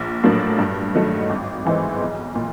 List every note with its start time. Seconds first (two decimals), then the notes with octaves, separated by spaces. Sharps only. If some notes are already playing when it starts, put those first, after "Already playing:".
Already playing: A#1
0.24 A2 F#3 A#3 D4
0.59 G2
0.95 D#3 F#3 A3
1.29 G#1
1.65 G#2 E3 G#3 C4
2.01 B1
2.35 A#2